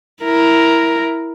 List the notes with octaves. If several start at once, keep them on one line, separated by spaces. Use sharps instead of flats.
E4 A#4